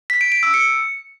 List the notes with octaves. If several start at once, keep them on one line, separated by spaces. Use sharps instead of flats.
B6
D7
D7
E6
C#7